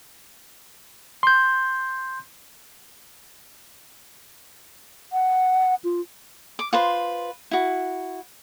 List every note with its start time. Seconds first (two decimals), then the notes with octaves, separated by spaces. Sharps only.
1.23 C6 G6
5.13 F#5
5.84 F4
6.59 D6
6.73 F4 B4 C5
7.51 E4 F#4